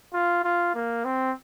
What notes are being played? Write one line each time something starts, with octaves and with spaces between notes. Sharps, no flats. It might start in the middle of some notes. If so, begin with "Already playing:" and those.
F4
F4
A#3
C4